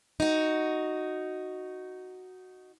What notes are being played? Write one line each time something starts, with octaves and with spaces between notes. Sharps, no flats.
D#4 F#4